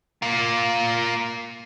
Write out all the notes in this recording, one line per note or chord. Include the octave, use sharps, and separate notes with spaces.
A#3 F4